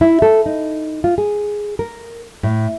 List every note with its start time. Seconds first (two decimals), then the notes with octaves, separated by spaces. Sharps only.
0.01 E4
0.22 A4
0.46 D#4
1.04 F4
1.18 G#4
1.79 A#4
2.43 A2